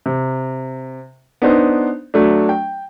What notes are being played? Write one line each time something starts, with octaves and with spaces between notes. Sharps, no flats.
C3
B3 D4 D#4 C5
F#3 A3 D4
G5